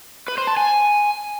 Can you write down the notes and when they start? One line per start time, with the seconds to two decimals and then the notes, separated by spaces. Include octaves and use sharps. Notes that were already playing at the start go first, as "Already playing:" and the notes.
0.28 B4
0.38 C5
0.47 A5
0.57 G#5